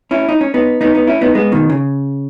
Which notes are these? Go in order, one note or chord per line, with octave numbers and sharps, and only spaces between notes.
C#4 E4
D#4
C#4
B3 D#4
B3 D#4
B3 D#4
C#4 E4
B3 D#4
G#3 B3
B2 D#3
C#3